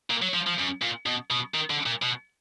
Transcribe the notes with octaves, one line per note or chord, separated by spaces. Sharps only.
A#2
F#3
F3
F3
F#2
A#2
B2
B2
D#3
D3
A#2
B2